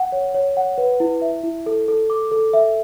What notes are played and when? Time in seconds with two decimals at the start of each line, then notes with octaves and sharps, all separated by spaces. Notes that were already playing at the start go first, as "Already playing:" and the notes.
Already playing: F#5
0.12 C#5
0.34 C#5
0.57 F#5
0.78 B4
1.00 E4
1.22 E5
1.43 E4
1.66 A4
1.88 A4
2.10 D6
2.32 A4
2.53 E5